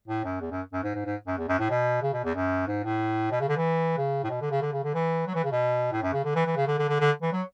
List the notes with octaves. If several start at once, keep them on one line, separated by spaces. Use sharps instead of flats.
A2
F#2
E2
F#2
F#2
G#2
G#2
G#2
F#2
E2
F#2
A2
B2
C#3
B2
E2
F#2
G#2
A2
B2
C#3
D3
E3
C#3
A2
B2
D3
C#3
D3
C#3
D3
E3
F#3
E3
C#3
B2
A2
F#2
C#3
D3
E3
E3
C#3
D3
D3
D3
D3
E3
F#3